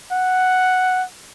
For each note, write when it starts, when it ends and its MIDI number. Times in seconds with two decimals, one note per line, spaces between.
0.12 1.04 78